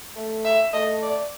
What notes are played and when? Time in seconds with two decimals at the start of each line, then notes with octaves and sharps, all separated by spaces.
0.16 A3
0.45 E5
0.73 A3 D#5
1.02 D5